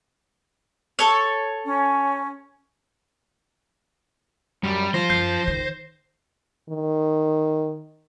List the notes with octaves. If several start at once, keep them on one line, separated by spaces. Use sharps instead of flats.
A4 C#5
C#4
F#2 G3
F3 F4 C5 A#6
F#2 G6 C7
D#3
D#3